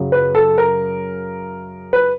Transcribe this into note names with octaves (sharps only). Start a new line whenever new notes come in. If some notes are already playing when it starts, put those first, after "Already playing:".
Already playing: F#2 C#3 F#3
B4
A4
A#4
B4